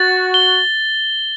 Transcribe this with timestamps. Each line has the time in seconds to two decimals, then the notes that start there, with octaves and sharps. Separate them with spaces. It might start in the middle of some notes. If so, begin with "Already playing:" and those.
Already playing: F#4 A6
0.34 G7